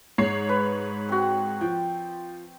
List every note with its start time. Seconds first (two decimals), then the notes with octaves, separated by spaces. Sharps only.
0.18 G#2 C#5 C7
0.49 B4
1.09 C4 F#4
1.61 F3 G5